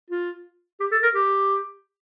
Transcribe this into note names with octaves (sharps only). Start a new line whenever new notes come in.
F4
G4
A4
A#4
G4